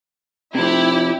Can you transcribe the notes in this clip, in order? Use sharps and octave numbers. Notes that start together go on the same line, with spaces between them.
C3 F3 E4 G4